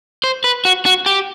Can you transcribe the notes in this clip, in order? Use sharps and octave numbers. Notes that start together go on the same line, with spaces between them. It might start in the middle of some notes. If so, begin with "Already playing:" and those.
C5
B4
F#4
F#4
G4